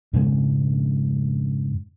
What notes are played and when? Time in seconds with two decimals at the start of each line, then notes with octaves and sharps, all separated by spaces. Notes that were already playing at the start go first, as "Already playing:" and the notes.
0.13 F2 G#2 C#3 G#3